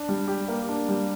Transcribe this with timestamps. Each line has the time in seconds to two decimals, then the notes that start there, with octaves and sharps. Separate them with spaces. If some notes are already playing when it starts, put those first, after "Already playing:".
Already playing: D4
0.09 G3
0.28 G4
0.48 A#3
0.69 D4
0.89 G3